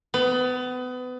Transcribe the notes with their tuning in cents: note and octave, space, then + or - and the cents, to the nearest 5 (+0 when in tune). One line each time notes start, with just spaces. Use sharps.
B3 +30